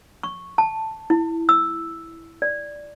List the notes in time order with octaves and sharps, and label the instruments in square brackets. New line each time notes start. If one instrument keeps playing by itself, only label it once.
[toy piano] C#6
A5
E4
E6
D5